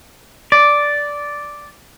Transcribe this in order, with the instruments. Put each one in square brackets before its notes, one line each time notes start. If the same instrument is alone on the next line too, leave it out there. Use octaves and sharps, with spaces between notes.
[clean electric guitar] D5